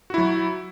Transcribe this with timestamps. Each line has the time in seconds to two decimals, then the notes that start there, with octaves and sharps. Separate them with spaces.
0.10 F#4
0.14 E4
0.18 F#3